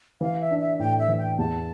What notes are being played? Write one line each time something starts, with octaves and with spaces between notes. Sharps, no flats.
E3 F5
E5
D4
E5
A2 G5
E5
E3
G5
E2 A5